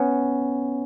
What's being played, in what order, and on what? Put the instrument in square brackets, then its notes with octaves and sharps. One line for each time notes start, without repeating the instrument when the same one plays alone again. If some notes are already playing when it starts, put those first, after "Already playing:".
Already playing: [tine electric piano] B3 C#4